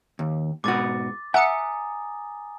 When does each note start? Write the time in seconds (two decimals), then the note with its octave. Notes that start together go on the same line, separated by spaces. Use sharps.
0.19 D#2
0.64 G#2 B2 F#4 D6 A6
1.34 E5 F#5 G#5 A#5 D#6 C#7